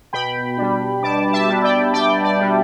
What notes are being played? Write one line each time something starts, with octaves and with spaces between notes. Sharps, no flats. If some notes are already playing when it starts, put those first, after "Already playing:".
B2 G5 B5
G3 D4
B2 A5 D6
E5 A5
G3 D4
D5 G5
B2 D5 G5
D5
G3 D4